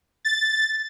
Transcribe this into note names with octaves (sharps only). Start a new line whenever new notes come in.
A6